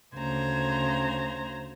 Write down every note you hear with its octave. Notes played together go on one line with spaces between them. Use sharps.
D2 C#3 C5 A#5 G#6